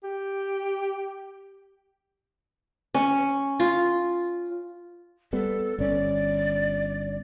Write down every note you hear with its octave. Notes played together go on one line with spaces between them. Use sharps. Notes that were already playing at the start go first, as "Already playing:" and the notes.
G4
C#4
F4
G3 B3 A4
G1 C#4 D5